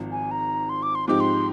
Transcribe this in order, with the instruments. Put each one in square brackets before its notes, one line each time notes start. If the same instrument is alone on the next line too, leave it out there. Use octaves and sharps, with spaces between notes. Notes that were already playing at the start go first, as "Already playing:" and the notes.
Already playing: [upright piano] G#1 G#2 F3
[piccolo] G#5
A#5
C6
D6
C6
[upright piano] G#2 F3 C4 D#4 G4 [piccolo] D6
[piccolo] C6